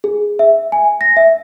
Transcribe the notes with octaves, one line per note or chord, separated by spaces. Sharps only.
G#4
E5
G#5
A#6
E5